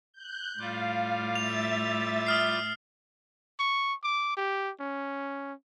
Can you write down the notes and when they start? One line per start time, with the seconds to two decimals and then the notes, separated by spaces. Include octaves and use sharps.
0.13 F#6 G6
0.59 A2 G3 F4 F5 D6
1.35 E5 A6 F7
2.27 D#6 F6 C7
3.60 C#6
4.03 D6
4.37 G4
4.80 C#4